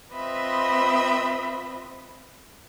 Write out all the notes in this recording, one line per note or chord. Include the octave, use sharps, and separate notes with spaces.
C4 F4 B4 D#5 E5 B5